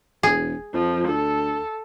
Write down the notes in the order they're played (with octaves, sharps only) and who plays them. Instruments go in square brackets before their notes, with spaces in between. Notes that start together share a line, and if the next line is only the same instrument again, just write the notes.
[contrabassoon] E1 [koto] G#4
[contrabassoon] F2 [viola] F3
[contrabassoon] D2 [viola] A4